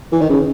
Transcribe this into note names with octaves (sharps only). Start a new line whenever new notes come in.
E3
D#3
C#3